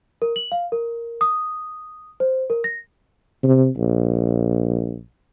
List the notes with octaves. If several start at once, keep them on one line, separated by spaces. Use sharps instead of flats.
A#4
F#7
F5
A#4
D#6
C5
A#4
A#6
C3
A#1